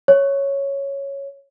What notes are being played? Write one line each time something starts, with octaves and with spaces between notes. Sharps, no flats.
C#5